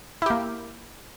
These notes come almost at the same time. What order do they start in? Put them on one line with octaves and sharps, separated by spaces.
E4 G4 A#3